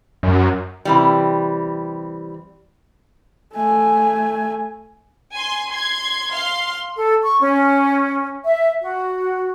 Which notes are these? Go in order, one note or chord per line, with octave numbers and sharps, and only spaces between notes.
F#2
C3 E3 G3
A3 G#5
G#5 C6
C6 G#6
F5 C6
A4
C#6
C#4
E5
F#4